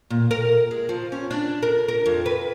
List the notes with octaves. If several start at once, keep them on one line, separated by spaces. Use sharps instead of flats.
A#2
A#4
G#3
F3
C#4
D4
A#4
A#4
F2
B4